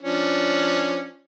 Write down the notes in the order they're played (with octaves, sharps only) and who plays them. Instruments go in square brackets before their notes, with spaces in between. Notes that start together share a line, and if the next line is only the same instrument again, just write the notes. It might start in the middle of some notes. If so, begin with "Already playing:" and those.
[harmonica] F3 C#4 D4